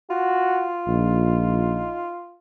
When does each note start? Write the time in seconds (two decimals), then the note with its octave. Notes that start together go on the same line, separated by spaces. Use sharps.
0.10 F4 F#4
0.88 A#1 D#4